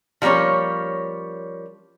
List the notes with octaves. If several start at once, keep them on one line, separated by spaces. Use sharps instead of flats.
F3 G3 A#3 C#4 C#5